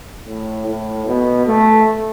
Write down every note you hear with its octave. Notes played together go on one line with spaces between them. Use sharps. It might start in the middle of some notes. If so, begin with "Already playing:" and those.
A2
A2
B2
A3